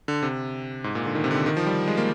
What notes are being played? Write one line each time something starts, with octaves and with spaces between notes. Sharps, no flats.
D3
C3
G#2
A#2
D3
D#3
C3
D3
D#3
F3
G3
G#3
A#3